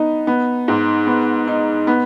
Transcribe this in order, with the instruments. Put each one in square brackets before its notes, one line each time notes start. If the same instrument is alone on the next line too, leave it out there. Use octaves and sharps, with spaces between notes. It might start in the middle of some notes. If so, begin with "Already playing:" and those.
Already playing: [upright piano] B3 D#4
B3
G#2
B3
D#4
B3